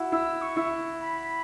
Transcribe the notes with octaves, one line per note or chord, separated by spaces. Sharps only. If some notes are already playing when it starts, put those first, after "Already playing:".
Already playing: E4 F#4
E4 E6
C#6
E4
B5